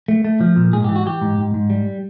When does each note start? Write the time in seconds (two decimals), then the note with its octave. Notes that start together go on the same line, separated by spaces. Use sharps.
0.08 A3
0.25 A3
0.41 F3
0.56 A#2
0.73 G#2 G#4
0.84 E3 G4
0.96 F#4
1.05 E3 G4
1.21 G#2
1.38 G#2
1.54 G#2
1.70 G3